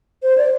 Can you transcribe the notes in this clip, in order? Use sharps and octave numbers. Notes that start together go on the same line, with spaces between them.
C5
D5